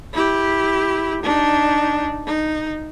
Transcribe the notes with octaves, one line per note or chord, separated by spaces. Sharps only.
E4 G4
D4 D#4
D#4